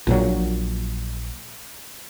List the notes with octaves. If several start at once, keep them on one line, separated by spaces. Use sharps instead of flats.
A#1 A#2 F#3